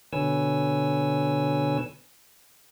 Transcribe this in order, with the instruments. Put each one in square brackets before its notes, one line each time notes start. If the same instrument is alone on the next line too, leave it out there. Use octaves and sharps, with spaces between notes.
[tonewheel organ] B2 D3 B4 C#5 G#5 E6